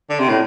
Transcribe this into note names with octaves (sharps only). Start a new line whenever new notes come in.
D3
C3
A2